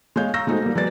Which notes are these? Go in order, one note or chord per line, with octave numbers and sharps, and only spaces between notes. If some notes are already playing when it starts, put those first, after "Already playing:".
G#3 C#5 F5 G6
F5 A#5 C#6 E6 G6 A#6
G#3 A3 D#4 F#4 C5
G3 A#3
F#3 G#3 B3 D5 A6